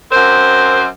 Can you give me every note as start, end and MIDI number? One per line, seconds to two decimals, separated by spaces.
0.11 0.85 42
0.11 0.85 60
0.11 0.85 70
0.11 0.85 72